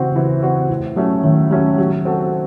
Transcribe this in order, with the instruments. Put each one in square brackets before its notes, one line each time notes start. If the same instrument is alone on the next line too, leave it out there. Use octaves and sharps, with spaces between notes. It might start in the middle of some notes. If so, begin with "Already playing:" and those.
Already playing: [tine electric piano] C#3 [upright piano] E3 C4 F#4
[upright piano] E3
C4 F#4
A2
F#3 A3 C#4
[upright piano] A2 [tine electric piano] D#3
[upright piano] F#3 A3 C#4
F#3
C4 F#4 A4